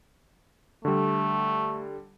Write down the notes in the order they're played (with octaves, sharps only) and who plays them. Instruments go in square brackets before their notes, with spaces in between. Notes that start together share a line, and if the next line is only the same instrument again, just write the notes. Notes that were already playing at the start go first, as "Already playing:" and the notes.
[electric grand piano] D3 G3 [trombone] A3